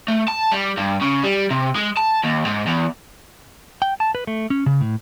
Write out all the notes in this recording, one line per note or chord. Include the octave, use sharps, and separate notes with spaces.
A3
A5
G3
G2
C#3
G3
C3
G#3
A5
D#2
G#2
E2
G5
A5
B4
A3
C#4
C#3
A2